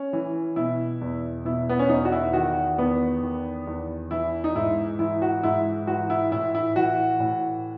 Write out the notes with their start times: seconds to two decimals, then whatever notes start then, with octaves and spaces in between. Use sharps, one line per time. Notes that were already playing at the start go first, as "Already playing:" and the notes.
Already playing: C#4
0.13 E3
0.56 B2 E4
1.01 E2
1.45 B2 E4
1.69 B3
1.79 C#4
1.89 E2 D#4
2.05 F#4
2.12 E4
2.33 D#3 F#4
2.78 E2 B3
3.22 D#3
3.67 E2
4.11 E3 E4
4.44 D#4
4.55 G#2 E4
4.99 E3 E4
5.22 F#4
5.43 G#2 E4
5.87 E3 F#4
6.10 E4
6.32 A2 E4
6.55 E4
6.76 E3 F#4
7.20 A2